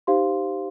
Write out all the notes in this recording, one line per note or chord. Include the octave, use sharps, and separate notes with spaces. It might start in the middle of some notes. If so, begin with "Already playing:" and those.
D#4 G4 C5 F5 C6